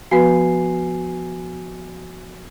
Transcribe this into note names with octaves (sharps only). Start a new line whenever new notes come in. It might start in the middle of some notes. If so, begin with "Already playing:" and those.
F3 B3 F#4 B4 G#5 C7